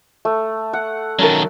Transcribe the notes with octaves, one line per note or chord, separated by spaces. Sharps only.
A3
F#5
D#3 F#3 C#4 A4 A#4